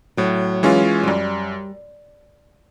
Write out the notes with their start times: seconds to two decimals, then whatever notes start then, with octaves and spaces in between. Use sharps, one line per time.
0.17 A2 F#3
0.63 E3 G#3 C#4 F4
1.03 F#3
1.07 F#2 G3